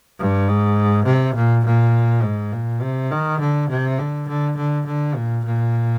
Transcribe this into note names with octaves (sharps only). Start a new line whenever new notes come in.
G2
G#2
C3
A#2
A#2
G#2
A#2
C3
D#3
D3
C3
D3
D3
D3
D3
A#2
A#2